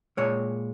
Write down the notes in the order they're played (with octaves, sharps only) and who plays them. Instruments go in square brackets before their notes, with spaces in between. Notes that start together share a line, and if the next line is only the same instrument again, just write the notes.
[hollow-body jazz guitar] A#2 G#3 C#5